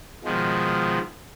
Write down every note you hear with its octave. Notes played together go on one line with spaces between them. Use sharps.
B2 D#3 F3 G#3